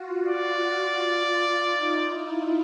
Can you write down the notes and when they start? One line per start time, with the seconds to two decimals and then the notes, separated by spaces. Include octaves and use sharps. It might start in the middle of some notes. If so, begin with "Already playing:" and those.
Already playing: F4 F#4
0.26 D5
1.70 D#4
2.07 E4